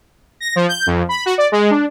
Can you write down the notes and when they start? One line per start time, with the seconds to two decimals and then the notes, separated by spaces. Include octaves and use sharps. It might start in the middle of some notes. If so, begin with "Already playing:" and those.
0.40 A#6
0.56 F3
0.69 G6
0.87 F2
1.09 B5
1.26 F#4
1.38 D5
1.52 G#3
1.70 D4